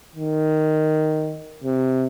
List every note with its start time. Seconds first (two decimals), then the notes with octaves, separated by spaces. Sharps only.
0.15 D#3
1.64 C3